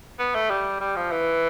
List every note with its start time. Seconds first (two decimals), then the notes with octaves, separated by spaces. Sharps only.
0.19 B3
0.35 A3
0.50 G3
0.81 G3
0.96 F3
1.12 E3